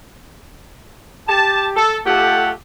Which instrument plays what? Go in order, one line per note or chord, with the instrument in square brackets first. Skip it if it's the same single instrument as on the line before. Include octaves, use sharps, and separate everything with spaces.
[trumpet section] G4 [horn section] A5
[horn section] A4
[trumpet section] A3 F#5 [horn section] F4 G4 A4